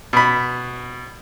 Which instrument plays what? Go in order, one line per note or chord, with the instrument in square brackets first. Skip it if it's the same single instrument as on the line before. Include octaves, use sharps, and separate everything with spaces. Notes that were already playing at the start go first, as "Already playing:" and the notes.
[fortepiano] B2 B5